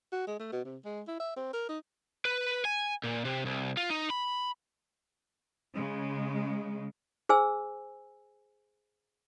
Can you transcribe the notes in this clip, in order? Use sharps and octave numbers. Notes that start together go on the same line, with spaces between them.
F#4
G#3
A3
B2
C3
G#3
E4
E5
C4
A#4
D#4
B4
G#5
A#2
C3
C2
F4
D#4
B5
C#3 G#3
G#4 C5 G#5 E6